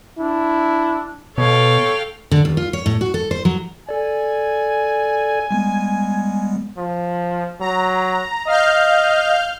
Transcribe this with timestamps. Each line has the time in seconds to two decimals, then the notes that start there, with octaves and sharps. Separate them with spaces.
0.19 D4 E4
1.38 B2 A4 C#5 F5 G5
2.31 D3
2.45 D#2
2.57 F4
2.73 C#5
2.86 A2
3.01 F#4
3.14 A4
3.31 C5
3.45 F#3
3.89 A4 D5 G#5
5.51 G3 G#3 B3
6.78 F3
7.61 F#3 A#5
8.47 D#5 F5 F6 G6